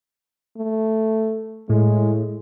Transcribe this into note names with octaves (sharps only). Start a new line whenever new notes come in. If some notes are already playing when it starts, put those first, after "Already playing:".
A3
A2 G#3